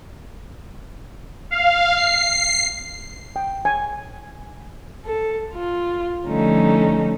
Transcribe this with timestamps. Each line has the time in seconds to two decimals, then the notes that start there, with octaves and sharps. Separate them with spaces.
1.51 F5
1.97 C7
3.36 G5
3.65 G#5
5.04 A4
5.52 F4
6.25 D3 F3 G3 A3 C#4 D#4